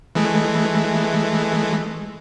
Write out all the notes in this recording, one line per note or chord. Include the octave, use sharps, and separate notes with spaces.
E3 G#3 A3